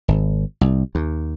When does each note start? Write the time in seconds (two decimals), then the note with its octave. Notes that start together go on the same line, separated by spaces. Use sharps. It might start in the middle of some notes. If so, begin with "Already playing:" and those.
0.08 G#1
0.61 C2
0.95 D#2